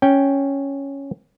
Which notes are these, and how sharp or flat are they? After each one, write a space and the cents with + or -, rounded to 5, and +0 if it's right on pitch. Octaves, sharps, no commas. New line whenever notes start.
C#4 +0 G5 +0